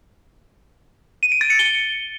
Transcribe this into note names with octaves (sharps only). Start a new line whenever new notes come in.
D#7
D7
A6
C#7
G7